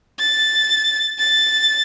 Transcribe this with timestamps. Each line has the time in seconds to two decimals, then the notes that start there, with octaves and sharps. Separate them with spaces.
0.20 A6
1.19 A6